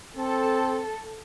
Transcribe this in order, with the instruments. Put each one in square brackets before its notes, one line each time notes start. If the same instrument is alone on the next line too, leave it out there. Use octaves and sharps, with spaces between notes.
[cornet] C4 [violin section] A4